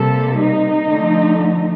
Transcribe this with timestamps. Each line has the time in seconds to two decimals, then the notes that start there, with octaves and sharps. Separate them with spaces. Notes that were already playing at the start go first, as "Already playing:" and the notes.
Already playing: C3 G3 A#3 A4
0.38 D#4
0.88 D3 F3 A3